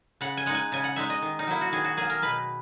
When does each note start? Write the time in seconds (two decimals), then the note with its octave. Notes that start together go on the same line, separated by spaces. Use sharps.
0.21 C#3 F#5
0.37 G#5
0.46 G#3 D#4 F#5
0.54 G#5
0.72 C#3 G#5
0.84 F#5
0.96 G#3 D#4 E5
1.10 D#5
1.22 D#3
1.39 D#4
1.47 F#3 A#3 E4
1.61 F#4
1.72 D#3 G#4
1.85 F#4
1.97 F#3 A#3 G#4
2.10 A#4
2.22 B2 B4